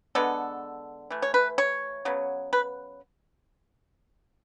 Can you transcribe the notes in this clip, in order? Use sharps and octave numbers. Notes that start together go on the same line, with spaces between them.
D3 G#3 B3 A4
E3 A3
C#5
B4
C#5
C#3 F#3 B3
B4